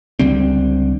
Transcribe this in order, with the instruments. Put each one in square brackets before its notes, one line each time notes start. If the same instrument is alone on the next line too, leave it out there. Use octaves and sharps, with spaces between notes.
[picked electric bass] C#2 D3 G3 C4